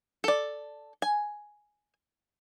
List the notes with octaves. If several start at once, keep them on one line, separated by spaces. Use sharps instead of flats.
A4 D5
G#5